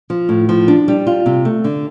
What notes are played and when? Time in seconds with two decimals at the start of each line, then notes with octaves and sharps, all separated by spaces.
0.10 F3
0.29 A2
0.49 F3
0.68 D4
0.88 G3
1.07 F4
1.26 C3
1.45 A3
1.64 D3